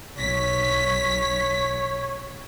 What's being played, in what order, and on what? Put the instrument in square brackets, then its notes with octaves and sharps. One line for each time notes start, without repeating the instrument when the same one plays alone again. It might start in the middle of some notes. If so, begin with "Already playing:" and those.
[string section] B1 B6 [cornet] C#5